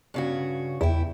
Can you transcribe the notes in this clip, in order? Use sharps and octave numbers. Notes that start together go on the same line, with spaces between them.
G2 C#3 F#4
E2 E4 G5